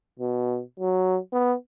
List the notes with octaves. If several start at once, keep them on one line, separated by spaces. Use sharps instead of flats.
B2
F#3
B3